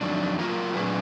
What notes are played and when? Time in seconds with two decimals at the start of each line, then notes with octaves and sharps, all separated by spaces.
0.01 F2 D#3 F#3 D4
0.38 F#3 A#3 F4 A#4
0.74 A#2 F#3 D4 G#4 B4